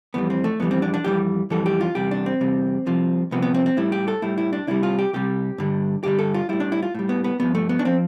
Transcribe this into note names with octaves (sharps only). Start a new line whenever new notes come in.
F2 E3 G3 B3
C4
A3
F2 E3 G3 B3
C4
D4
D4
F2 E3 G3 G4
F2 E3 G3 A4
G4
F4
E2 C3 G3 G4
D4
C4
E2 C3 G3
C2 C3 F3
C2 C3 F3 B3
B3
C4
C4
A2 G3 E4
G4
A4
A2 G3 E4
E4
D4
C2 C3 G3 E4
F4
G4
C2 C3 G3 G4
G2 D3 G3
G2 D3 G3 G4
A4
F4
A2 G3 E4
D4
E4
F4
A2 G3
B3
B3
G2 F3 B3
A3
B3
D4
F3 C4